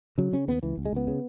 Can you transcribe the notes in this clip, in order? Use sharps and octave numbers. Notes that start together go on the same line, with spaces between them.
C#3 F#3
C#3 C#4
D#2 B3
C#2 E3
C#2
G#3
C#2 B3
C#3